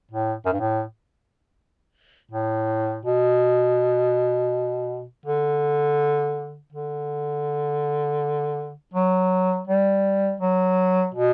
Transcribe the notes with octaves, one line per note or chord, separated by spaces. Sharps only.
A2
F#2
G2
A2
A2
B2
D3
D3
F#3
G3
F#3
B2